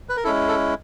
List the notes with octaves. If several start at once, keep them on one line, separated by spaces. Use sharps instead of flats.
B4
A#4
G#3 C#4 E4 A4
A4